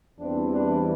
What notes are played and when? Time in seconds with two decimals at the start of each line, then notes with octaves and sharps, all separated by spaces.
0.19 E2 E3 G3 C4 D4
0.50 D4